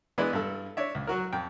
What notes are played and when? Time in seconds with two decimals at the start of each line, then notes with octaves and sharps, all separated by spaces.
0.18 E3 G#3 B3 D4 E4
0.33 G2 A4
0.77 D4 C#5 E5
0.95 C#2
1.07 F#3 F#4 A#4
1.33 F2 G5